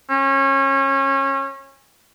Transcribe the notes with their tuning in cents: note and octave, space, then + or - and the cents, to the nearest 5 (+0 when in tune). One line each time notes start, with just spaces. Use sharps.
C#4 -25